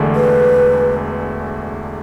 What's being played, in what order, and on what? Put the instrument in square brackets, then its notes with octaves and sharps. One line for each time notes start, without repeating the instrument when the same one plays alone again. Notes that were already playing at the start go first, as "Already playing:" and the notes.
Already playing: [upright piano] E1 E2 D3 A3
[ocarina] B4